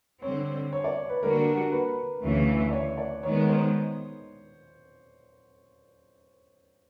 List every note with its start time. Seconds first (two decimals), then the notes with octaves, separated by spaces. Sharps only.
0.22 D3 G3 C4 C#5
0.73 C#5
0.84 D5
1.09 B4
1.22 D3 G3 A#3 D4 F#4 A#4
1.72 B4
2.22 D2 C#3 E3
2.69 D5
2.73 C#5
2.98 D5
3.23 D#3 G#3 B3 C#5
3.49 C5